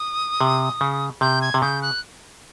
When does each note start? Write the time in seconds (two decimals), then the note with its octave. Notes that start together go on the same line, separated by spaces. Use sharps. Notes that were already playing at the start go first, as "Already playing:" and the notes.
Already playing: D#6
0.41 C3
0.81 C#3
1.21 C3 G6
1.42 G#6
1.54 C3
1.61 C#3 G6
1.82 F#6